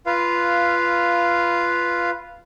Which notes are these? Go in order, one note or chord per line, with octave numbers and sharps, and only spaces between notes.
F4 B4 F5